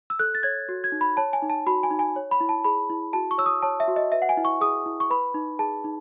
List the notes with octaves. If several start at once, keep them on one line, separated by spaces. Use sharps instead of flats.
E6
A4 F#6
A6
C#5 G#6
F#4
G#6
D#4
B5
C#5 A5
G#5
D#4
A5
F#4 B5
G#5
D#4
G#5
C#5
B5
E4
A5
G#4 B5
E4
F#4 A5
C#6
C#5 E6
D#6
C#5 A5
E5
F#4
D#5
B4 E5
F#5
G#5
E4
C#6
G#4 D#6
E4
C#6
B4 B5
D#4
G#4 A5
D#4